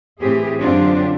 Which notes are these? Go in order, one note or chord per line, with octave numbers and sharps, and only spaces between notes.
A2 E3 C4 G4 G#4
F#2 D3 C4 D4 F4 G4